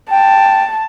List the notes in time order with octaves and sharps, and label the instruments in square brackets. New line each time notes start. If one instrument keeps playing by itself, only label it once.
[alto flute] G5 [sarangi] A5